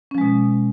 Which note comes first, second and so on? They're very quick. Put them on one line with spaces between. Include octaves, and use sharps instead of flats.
C#4 F3 G#3 B2